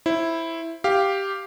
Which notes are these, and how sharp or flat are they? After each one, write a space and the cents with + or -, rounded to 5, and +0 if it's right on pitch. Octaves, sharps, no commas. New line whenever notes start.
E4 +0 C5 +20
G4 +0 F5 +0